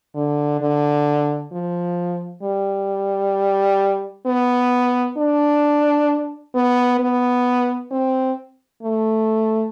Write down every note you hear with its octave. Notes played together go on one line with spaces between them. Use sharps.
D3
D3
F3
G3
B3
D4
B3
B3
C4
A3